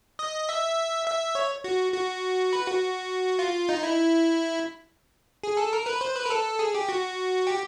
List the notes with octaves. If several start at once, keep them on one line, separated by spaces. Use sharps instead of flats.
D#5
E5
E5
C#5
F#4
F#4
B4
F#4
F4
D#4
E4
G#4
A4
A#4
B4
C5
B4
A#4
A4
G#4
G4
F#4
G4